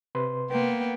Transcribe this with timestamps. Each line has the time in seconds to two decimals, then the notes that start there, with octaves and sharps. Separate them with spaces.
0.15 C3 B4 C6
0.51 A#3 B3 G5